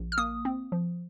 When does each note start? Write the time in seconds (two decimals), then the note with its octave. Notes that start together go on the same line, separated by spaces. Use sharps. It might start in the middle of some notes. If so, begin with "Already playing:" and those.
Already playing: A#1
0.12 F6
0.18 A#3 D#6
0.45 C4
0.72 F3